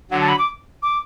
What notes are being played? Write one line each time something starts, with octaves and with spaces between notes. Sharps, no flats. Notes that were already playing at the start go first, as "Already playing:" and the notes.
D3 F#3 F#5
A5
B5
D6
D6